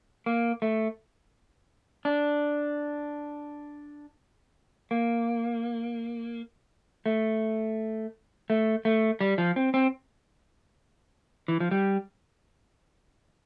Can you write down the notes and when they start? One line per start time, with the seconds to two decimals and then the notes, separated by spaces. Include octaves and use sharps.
0.26 A#3
0.62 A3
2.05 D4
4.91 A#3
7.06 A3
8.50 A3
8.85 A3
9.21 G3
9.38 F3
9.56 C4
9.74 C4
11.48 E3
11.60 F3
11.71 G3